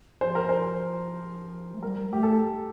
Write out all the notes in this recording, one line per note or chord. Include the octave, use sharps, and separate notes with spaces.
F3 C5
A#4
C5
A3
G3 A#4
A3 G4
A4